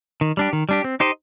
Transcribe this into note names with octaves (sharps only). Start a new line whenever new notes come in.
D#3
G3 D4 G4
D#3
G3 D4 G4
C4
D#4 G4 C5 D#5